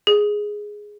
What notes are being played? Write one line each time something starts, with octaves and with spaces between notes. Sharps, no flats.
G#4